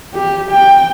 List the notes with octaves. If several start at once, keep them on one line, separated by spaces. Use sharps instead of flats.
G4
G5